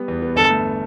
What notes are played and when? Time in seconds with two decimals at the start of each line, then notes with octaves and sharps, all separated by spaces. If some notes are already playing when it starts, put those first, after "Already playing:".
Already playing: G3 B3
0.08 E2
0.22 B3
0.36 G1 A4
0.50 A3